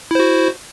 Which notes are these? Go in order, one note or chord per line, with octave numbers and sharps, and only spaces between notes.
E4 F#4 C5